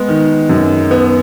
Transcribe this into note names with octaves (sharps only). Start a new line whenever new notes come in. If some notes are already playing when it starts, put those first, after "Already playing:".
Already playing: G#3 B3
D#3
F#2
B3